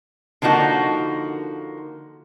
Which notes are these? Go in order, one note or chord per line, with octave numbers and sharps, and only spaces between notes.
D3 F3 A#3 D#4 F#4